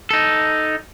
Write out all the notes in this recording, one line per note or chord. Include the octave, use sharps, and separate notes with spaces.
D#4 A4